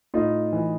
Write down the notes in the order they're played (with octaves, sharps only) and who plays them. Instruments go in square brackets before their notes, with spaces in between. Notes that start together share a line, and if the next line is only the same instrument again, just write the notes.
[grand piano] A2 D#4 F4
E3